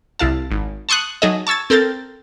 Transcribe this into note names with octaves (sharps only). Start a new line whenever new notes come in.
C2 E4 F5 A5
G#1
A5 C6 C#6 D#6 F#6
F#3 D#4 G#4 A4 D#5
A5 C#6 E6 G#6 A6
C4 A4 A#4 G6 A6